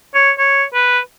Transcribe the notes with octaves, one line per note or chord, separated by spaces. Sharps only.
C#5
C#5
B4